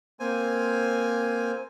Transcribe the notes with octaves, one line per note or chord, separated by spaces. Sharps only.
A#3 C4 C5 G#5